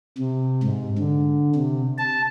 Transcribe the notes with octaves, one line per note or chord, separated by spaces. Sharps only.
C3
G#2
D3
C3
A5